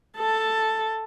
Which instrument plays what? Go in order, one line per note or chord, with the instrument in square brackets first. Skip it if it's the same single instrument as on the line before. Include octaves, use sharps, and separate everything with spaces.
[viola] A4 A5